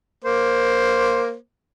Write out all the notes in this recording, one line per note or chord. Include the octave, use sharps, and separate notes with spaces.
A#3 C5